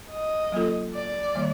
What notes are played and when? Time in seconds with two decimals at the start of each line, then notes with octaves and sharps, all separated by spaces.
0.11 D#5
0.52 F#3 A#3 C#4 F4 A4
0.95 D5
1.35 D#3 G3 A#3